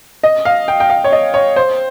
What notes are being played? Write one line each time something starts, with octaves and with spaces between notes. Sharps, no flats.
D#5
F5
G5
G5
F5
C#5
D#5
C#5
C5